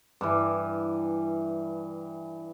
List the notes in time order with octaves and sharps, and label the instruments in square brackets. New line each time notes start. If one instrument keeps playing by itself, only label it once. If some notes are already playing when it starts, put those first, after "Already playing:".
[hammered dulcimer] G2 E3